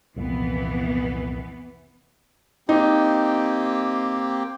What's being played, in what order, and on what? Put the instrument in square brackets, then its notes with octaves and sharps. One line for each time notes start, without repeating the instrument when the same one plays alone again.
[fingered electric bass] C2 F2 A#2 [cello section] E3 B3
[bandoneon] A#3 C4 G4 [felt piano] D#4